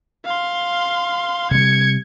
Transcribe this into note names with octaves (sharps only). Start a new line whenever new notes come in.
F5 C6
C3 G3 G#6 C#7